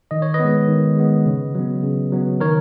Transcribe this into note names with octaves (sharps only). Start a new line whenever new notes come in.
D#3 D#5
C#5
B4 D#5
G#3 B3
D#3
G#3 B3
C#3
F#3 B3
C#3
F#3 B3
D#3 A#4 C#5